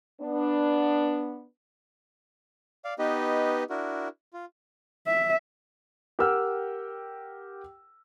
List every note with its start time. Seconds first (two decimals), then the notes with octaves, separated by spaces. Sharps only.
0.21 B3 D4
2.85 D5 F5
2.99 B3 D#4 G4 B4 D#5
3.70 D4 E4 F#4 A#4
4.33 F4
5.07 E5
6.19 G4 A#4 F#5 G5 E6 F6